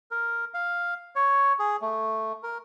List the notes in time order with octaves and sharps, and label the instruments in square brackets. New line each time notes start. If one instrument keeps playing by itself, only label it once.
[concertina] A#4
F5
C#5
G#4
A3
A#4